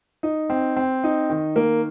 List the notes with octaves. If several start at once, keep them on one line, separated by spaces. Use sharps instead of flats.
D#4
C4
C4
D#4
D#3
A#3